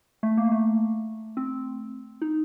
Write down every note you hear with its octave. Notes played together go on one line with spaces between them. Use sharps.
A3
A#3
A3
C4
D#4